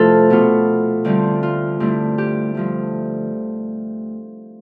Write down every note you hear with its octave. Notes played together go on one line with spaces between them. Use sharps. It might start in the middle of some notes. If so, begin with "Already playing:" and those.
Already playing: C3 F3 A3 E4 F4 A4 B4
B2 B3 F4
D2 D3 G3 C4 F4
F4
G2 D3 A3 C4 E4
G4
G2 F3 A3